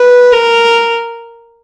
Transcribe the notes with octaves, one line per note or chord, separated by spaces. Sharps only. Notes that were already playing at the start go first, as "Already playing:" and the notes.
Already playing: B4
A#4